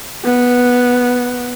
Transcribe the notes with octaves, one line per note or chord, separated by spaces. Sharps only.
B3